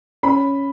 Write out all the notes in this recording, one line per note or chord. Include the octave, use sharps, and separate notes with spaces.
C#4 B5